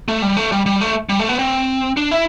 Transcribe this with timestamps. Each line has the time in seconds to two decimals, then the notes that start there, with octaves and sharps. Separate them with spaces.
0.08 A3
0.22 G3
0.37 A3
0.52 G3
0.66 G3
0.81 A3
1.09 G3
1.19 A3
1.29 B3
1.39 C4
1.97 D4
2.11 E4